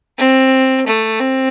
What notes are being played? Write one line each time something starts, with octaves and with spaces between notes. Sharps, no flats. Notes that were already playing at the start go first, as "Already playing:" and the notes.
C4
A3
C4